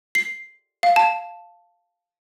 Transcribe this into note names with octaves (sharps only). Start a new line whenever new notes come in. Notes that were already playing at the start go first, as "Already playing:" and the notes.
C7
F5
A5